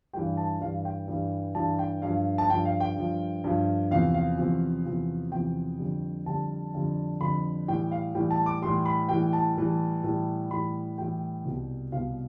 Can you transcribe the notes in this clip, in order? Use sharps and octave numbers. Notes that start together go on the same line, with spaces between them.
G2 E3 G3 G5
A5
G2 E3 G3 F5
G5
G2 E3 G3
G2 E3 G3 A5
G5
G2 F3 F5
A5
G2 F3 G5
F5
G5
G2 F3
G2 F3
E2 C3 F3 F5
F5
E2 C3 F3
E2 C3 F3
E2 C3 F3 G5
F2 D3 G3
F2 D3 G3 A5
F2 D3 G3
F2 D3 G3 B5
A2 E3 G3 G5
F5
A2 E3 G3 G5
A5
D6
A2 E3 G3 C6
B5
A2 E3 G3 G5
A5
A2 E3 G3
A2 E3 G3
A2 E3 G3 B5
A2 E3 G3 G5
C2 B2 G3
C2 B2 G3 F5